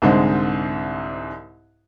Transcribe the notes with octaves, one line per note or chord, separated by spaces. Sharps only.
C2 G#2 D3 G#3 C4